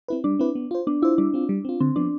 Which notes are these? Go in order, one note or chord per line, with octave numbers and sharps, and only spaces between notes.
C4 E4 B4
G3 D4
C4 E4 B4
B3
F4 C5
B3 D4
E4 F4 C5
G3 D4
C4 F4
G3
C4 F4
D3 C4
F3 B3 D4